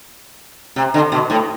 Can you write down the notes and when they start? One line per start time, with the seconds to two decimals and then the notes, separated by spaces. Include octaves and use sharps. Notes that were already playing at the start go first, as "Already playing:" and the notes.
0.76 C3
0.94 D3
1.12 B2
1.30 A2